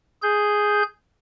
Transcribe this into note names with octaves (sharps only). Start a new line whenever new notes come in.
G#4 G6